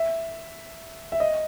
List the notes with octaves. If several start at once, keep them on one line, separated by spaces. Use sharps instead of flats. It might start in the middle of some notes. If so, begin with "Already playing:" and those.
Already playing: E5
E5
D#5